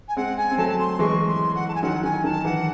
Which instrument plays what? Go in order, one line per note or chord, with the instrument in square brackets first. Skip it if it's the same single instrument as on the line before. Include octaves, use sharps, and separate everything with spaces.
[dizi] G#5
[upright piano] G#3 C4 [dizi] F#5
[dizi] G#5
[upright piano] C4
[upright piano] F#3 A3 [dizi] A5
[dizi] A5
C6
[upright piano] E3 G#3 [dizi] C#6
[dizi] C6
F#5
A5
G#5
[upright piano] D#3 F#3 [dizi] F#5
[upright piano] D#3 [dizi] G#5
[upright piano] D#3 [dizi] A5
[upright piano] E3 [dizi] F#5